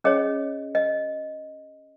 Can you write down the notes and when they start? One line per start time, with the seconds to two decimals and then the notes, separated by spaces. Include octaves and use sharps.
0.04 C#4 G#4 C#5 D#5
0.75 D#5